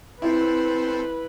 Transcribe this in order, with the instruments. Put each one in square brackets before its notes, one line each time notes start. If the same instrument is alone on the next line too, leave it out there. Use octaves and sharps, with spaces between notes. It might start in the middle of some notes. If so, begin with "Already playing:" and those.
[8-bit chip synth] C4 A4 C5 [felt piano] E4 [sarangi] B4